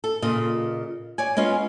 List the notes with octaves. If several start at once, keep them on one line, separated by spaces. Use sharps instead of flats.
A4
A#2 C#3 F4 D#5
C#5 D5 G#5
G#3 B3 C#4 F4 G#4